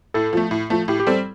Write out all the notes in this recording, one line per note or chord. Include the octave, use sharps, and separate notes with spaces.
A2 A4
F3 A3
A2
F3 A3
A2 G4
G4
G3 C4 A4